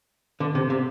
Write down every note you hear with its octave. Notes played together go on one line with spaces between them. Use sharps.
D3
C3
C3